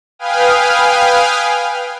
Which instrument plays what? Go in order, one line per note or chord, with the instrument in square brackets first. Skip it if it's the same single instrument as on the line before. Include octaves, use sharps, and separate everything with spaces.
[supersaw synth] B4 F5 G5 G#5 D#6 F6